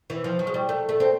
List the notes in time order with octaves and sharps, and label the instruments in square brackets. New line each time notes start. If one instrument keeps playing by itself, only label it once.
[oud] E3
F3
F#3
G#3
G3
A3
A3
C4